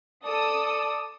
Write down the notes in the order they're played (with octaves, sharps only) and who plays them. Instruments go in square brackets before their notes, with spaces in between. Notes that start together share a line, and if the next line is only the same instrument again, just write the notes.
[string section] A4 D#6 E6 [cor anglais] D5